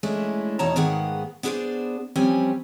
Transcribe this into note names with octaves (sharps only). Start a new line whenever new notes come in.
G#3 A3 C#4 D4 E4
E2 B2 D#4 C#5 A5 A#5
G#2 D#3 A#3 B3 G#4 F#5
B3 D4 G#4 B4 C5 D5
F3 G3 C4 C#4 G#5